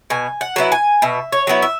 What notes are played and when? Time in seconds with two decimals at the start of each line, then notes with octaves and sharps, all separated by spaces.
0.10 B2 G#5
0.41 F#5
0.56 F#3 B3 E4
0.72 G#5
1.02 B2 E5
1.32 C#5
1.47 F#3 B3 E4
1.62 E5